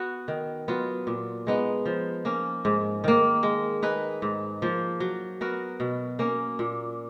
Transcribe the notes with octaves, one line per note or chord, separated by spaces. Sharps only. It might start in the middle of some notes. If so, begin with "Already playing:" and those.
Already playing: B3 F#4
D#3
F#3 B3 F4
A#2
G#3 B3 D#4
F3
A#3 C#4
G#2
D#3 A#3
G#3
D#4 G#4 B4
G#2
F3 A#3
F#3
B3 F#4 A#4
B2
A#3 C#4
A#2